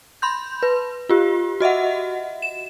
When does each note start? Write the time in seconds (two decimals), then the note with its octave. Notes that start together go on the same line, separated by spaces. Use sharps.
0.22 B5 C6 G6
0.63 B4
1.09 F4 G4
1.60 F#4 D#5 E5 F#5
2.42 E7